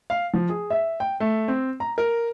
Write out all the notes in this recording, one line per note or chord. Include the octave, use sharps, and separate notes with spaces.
F5
F3
G#4
E5
G5
A3
C4
A#5
A#4